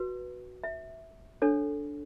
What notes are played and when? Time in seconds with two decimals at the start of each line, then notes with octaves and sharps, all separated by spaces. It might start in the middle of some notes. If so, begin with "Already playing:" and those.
Already playing: F#4 B4
0.64 E5
1.42 D4 A4 C#5